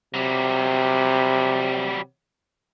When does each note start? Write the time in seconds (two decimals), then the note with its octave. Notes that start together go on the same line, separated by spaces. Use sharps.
0.14 C3 F#3 G3